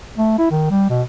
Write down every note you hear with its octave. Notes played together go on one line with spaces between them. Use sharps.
A3
E4
D#3
G3
B2